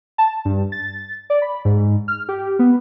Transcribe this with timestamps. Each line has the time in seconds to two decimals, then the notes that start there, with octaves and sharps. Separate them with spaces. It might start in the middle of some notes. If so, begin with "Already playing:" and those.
0.18 A5
0.45 G2
0.72 A6
1.30 D5
1.42 B5
1.65 G#2
2.08 F6
2.29 G4
2.59 B3